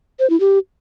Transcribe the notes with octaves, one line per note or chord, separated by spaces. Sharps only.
C5
E4
G4